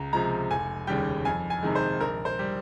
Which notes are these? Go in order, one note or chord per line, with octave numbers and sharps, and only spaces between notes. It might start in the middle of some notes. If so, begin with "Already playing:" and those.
Already playing: C#2 A#5
C3 F3 G#3 A#5
F1 G#5
D#2 C#3 G3 G5
F2 G#5
G#5
C3 D#3 G#3
C5
A#1 A#4
C5
G3